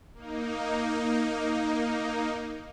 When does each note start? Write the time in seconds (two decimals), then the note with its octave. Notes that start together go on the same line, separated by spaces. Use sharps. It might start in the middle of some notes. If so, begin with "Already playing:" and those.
0.14 A#3 D#4